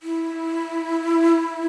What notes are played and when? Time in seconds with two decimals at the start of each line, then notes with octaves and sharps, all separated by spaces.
0.03 E4